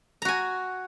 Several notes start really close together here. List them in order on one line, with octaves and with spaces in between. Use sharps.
A#5 F#4 G#5